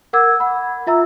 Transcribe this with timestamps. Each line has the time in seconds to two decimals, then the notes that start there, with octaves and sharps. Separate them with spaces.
0.13 A#4 F#5 D6 E6 G#6
0.40 F#5 B5
0.87 F4 E5 A#5 E6